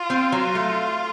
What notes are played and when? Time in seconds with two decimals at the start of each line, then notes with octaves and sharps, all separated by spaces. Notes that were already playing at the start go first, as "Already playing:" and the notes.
Already playing: F4
0.10 C4
0.32 F#3
0.55 A3